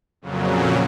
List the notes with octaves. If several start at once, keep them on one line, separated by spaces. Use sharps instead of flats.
F2 A#2 C#3 F#3